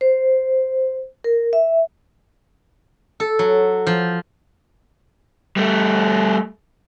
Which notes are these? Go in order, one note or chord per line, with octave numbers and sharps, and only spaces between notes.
C5
A#4
E5
A4
F#3
F3
G3 A3